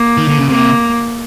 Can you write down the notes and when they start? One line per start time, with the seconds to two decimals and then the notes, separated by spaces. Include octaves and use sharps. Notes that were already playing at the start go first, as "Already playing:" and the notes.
Already playing: A#3
0.17 D#3
0.28 D3
0.38 C#3
0.49 C3 A#3